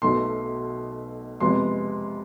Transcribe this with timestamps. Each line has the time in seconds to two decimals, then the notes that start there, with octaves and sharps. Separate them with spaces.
0.02 B1 B2 A3 C6
1.40 F2 C3 G#3 B3 C6